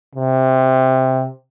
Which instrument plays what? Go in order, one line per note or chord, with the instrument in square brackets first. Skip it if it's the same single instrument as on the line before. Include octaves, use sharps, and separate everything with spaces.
[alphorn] C3